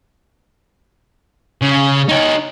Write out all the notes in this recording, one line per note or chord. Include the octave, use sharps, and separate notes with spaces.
C#3
D#4 C#5